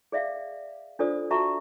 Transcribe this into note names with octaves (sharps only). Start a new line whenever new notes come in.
G#4 D5 E5 F5
D4 F4 A4 C5 D5 D#6
F#4 A4 E5 A5 A#5 C#6